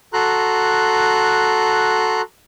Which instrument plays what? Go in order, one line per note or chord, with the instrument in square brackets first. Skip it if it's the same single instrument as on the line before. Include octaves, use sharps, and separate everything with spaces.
[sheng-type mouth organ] F#4 A4 A#5 C6 F#6